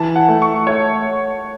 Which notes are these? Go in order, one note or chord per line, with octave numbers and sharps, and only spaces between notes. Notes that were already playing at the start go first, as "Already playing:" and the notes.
Already playing: E3 A5
F#5
A3
C#6
A3 C#5